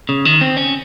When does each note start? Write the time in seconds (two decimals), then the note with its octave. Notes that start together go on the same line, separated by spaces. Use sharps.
0.09 C#3
0.25 D#3
0.41 C4
0.57 C#4